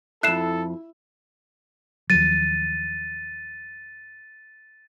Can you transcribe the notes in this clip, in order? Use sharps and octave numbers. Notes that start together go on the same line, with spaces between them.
F2 E4 A4 E5 F#6 C7 E7
D#2 F3 F#3 A6 D#7